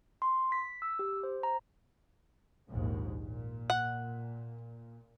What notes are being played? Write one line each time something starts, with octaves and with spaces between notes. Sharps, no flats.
C6
B6
E6
G4
C5
A#5
A#1 D#2 G#2
A#2
F#5